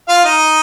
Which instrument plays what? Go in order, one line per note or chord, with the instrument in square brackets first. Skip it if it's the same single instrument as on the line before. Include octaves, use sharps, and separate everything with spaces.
[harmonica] F4 F5
D#4 D#5